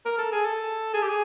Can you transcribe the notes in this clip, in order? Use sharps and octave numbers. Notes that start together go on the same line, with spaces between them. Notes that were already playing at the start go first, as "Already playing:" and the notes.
A#4
A4
G#4
A4
G#4
G4
G#4